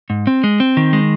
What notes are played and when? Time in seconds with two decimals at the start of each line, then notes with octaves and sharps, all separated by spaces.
0.10 G#2
0.27 C4
0.44 G#3
0.60 C4
0.77 D#3
0.93 G#3